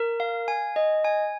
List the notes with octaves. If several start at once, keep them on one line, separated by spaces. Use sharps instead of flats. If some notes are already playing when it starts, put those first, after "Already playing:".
Already playing: A#4
F5
G#5
D#5
G#5